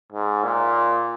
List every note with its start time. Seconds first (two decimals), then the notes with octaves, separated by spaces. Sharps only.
0.12 G#2
0.44 A#2